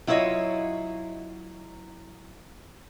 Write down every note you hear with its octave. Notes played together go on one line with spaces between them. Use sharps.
F#3 E4 F4 C5 C#5 D#5